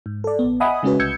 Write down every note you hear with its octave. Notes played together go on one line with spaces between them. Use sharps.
G#2
A4 D5
A#1 B3
D#5 E5 F#5 G#5 B5 D#6
C#3 G#3 C#4 F#4 B4
C2 E6 G6 G#6 C#7